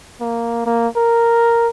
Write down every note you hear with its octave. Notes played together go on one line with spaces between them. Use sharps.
A#3
A#3
A#4